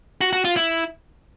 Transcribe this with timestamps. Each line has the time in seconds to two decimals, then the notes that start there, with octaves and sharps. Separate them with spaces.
0.21 F#4
0.33 F#4
0.45 F4
0.57 E4